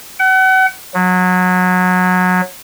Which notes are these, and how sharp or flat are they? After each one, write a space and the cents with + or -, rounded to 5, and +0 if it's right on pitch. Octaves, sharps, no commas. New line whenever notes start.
F#5 +35
F#3 -25